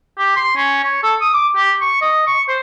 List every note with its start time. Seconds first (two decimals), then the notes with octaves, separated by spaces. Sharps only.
0.18 G4
0.36 C6
0.56 C#4
0.83 C#5
1.03 A4
1.21 D#6
1.34 D6
1.56 G4
1.81 C#6
2.01 D#5
2.27 C#6
2.48 C5